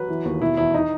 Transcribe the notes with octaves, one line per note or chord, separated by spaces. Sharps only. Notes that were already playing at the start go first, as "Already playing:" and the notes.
Already playing: F#3 B4
E3
D#2
B2 E4
E2 E4
D#4